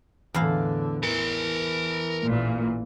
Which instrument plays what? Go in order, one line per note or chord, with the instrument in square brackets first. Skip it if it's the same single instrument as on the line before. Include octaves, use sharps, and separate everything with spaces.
[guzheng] E2 E4 F5 [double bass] A2 D3
[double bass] E3 [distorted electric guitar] A#4 A5
[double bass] A1 E3 [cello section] A#2